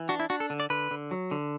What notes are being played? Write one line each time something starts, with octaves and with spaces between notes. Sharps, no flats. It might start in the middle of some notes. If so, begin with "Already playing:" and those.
Already playing: E3
D4 F#4
E4
D4 F#4
A4
D3
D5
D3 B4
D3
F#3
D3